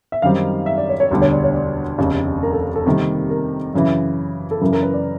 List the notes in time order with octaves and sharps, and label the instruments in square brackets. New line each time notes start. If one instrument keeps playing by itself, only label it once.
[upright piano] E5
[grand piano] F#2 D#3 G3 C4 D#4 [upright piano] F5
[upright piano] E5
D5
C#5
C#5
[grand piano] E1 D2 D3 G3 [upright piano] C#5
[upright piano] C#5
D5
C#5
D5
[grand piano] F1 D#2 C#3
[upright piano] A#4
A4
A4
[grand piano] C3 D#3 G3 A#3
[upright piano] A#4
[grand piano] F#2 C#3 E3
[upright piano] A4
[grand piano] F#2 C#3 E3 [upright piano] A#4
[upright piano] A#4
B4
D5